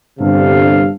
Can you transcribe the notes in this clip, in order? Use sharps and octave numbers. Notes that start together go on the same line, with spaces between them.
G1 G2 C3 A4 F5